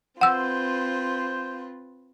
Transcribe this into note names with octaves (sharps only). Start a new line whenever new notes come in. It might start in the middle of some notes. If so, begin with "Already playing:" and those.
C4 F4 B4 C5 F#5 E6